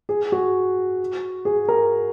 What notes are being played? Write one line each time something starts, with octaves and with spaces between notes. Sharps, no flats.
G#4
F#4
G#4
A#4